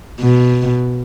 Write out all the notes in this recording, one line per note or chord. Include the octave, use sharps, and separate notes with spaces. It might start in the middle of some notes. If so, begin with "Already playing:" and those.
B2